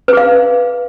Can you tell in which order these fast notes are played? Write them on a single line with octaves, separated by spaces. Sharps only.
B4 G#4 F5